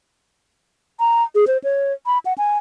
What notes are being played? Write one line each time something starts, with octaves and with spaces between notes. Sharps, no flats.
A#5
G#4
C5
C#5
B5
F#5
G#5